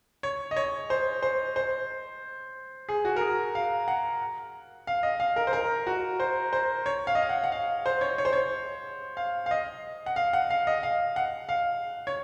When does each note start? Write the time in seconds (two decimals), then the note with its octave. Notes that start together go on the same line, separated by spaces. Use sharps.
0.23 C#5
0.51 D#5
0.56 C#5
0.90 C5
1.22 C5
1.56 C5
2.89 G#4
3.05 F#4
3.16 A#4
3.21 G#4
3.55 F5
3.88 F#5
4.87 F5
5.03 D#5
5.20 F5
5.36 A#4
5.47 C5
5.53 A#4
5.87 F#4
6.20 C5
6.53 C5
6.86 C#5
7.07 F5
7.15 D#5
7.22 F5
7.29 F#5
7.44 F#5
7.52 F5
7.86 C5
8.01 C#5
8.18 C#5
8.25 C5
8.33 C#5
9.17 F5
9.46 F5
9.51 D#5
10.06 F#5
10.16 F5
10.33 F#5
10.50 F5
10.67 D#5
10.83 F5
11.16 F#5
11.49 F5
12.07 C#5